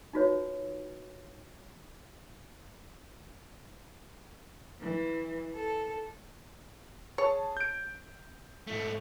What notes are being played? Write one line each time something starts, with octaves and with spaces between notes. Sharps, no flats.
D#4 F4 F#4 B4 C#5
E3
A4
G#4 C#5 A5
G6 D7
G#2 A3